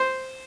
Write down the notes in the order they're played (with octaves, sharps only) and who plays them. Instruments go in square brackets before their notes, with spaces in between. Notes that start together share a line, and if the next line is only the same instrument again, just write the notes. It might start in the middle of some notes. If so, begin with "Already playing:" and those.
Already playing: [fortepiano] C5